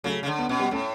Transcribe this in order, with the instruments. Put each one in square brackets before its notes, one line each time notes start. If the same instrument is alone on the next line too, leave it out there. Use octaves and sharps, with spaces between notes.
[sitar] C#3 [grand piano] F#3 A3
[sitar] C#3
D3
[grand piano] B3
[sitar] B2 [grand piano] C#4
[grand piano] G3 B3
[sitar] A2 [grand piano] A3 C#4